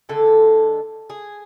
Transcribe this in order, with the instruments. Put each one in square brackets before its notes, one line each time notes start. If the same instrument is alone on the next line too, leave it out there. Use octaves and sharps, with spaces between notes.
[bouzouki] D3 G#3 A4
G#4